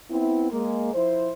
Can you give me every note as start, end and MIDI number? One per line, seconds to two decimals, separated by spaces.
0.10 0.48 59
0.10 0.48 60
0.10 0.48 64
0.52 0.91 56
0.52 0.91 58
0.94 1.31 53
0.94 1.31 64
0.94 1.31 72